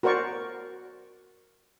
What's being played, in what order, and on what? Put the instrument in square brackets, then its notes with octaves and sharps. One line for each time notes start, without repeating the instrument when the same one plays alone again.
[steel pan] F#4 A#4 C5 D5 C#6